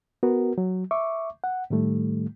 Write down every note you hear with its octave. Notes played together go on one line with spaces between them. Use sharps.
B3 F#4 A#4
F#3
E5 C#6 D6
F#5
A2 D#3 G3 A3